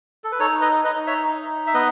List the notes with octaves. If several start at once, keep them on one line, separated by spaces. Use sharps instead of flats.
A4
B4
D#4 A4 C#5
B4 D#5
D#4 B4 D#5
C#5 E5
D#4
E5
B3 B4 D#5